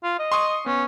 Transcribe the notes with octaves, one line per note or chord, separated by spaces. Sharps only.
F4
D#5
C6 C#6 D#6
B3 C#4